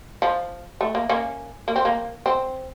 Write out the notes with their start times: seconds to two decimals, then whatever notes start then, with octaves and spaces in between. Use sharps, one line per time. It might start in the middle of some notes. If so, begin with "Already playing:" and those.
0.22 F3
0.81 A3
0.95 A#3
1.09 A#3 C#4
1.68 A#3
1.76 C4
1.85 A#3
2.26 C4